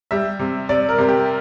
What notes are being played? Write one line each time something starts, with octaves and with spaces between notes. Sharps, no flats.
G3 E5
C3
C3 D5
A#4
C3
G4